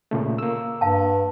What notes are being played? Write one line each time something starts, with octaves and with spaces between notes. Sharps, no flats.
A#2 C#3 A3
A#3 E6
G2 F5 A5